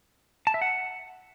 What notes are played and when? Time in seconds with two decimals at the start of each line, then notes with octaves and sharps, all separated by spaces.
0.47 A5
0.54 E5
0.61 F#5